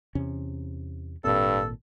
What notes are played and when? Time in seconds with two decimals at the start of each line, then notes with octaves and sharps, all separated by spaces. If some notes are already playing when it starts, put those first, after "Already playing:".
0.15 E2 C3 C#4
1.24 G#1 G2 A#2 C4 A4